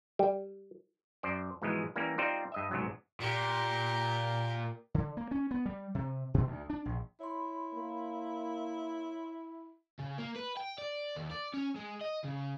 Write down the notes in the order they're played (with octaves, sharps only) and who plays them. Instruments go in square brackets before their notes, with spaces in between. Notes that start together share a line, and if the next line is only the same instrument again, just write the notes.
[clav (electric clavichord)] G3
F#2 C5 D5
G#2 B2 E3 F3 G#3
E3 G3 A#3 C#4
G3 C4 D#4 F4 C5 D5
G2 D#5 E5
B1 G#2 C3 F#3
[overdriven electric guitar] A#2 [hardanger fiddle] G4 A#4
[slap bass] D3
A#3
C#4
B3
G3
C3
B2
D2
D4
A#1
[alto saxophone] E4 [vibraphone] C#5 B5 C6
[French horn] A#3
[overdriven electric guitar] C#3
A#3
B4
G5
D5
D#2
D5
C#4
G#3
D#5
C#3